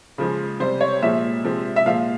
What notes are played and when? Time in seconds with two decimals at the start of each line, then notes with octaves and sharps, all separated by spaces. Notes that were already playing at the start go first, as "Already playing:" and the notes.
0.18 C#3 F3 G#3
0.60 C3 G3 C5
0.81 C#5
1.02 A#2 F3 G#3 E5
1.44 C3 F3 G#3
1.76 E5
1.86 A#2 F3 G#3 F5